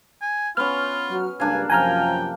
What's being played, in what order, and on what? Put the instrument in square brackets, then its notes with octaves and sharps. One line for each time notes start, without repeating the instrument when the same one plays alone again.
[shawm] G#5
[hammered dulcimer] B3 C#4 [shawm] F4 [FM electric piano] F6
[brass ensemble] F#3
[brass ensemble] C#2 G2 [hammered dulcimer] A#3 D4 F5 [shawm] G#5
[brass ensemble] F#2 C3 F3 [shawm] G5 [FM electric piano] G#5 A#5 F6